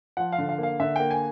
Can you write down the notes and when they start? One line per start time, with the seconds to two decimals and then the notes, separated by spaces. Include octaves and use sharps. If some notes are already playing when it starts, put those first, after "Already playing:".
0.17 F3 F#5
0.32 F5
0.38 D3
0.49 F5
0.58 A#3
0.63 F5
0.80 D3 E5
0.96 A#3 G5
1.11 G#5